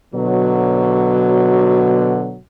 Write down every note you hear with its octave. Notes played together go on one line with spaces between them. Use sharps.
B2 D3 F#3